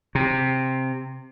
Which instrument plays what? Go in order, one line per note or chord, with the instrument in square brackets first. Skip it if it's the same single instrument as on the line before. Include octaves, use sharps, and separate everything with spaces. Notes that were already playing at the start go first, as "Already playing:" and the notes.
[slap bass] C3